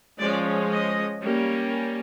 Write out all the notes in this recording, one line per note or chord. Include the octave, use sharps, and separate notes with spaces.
F3 G#3 C#4 D5
D#5
G3 A#3 C#4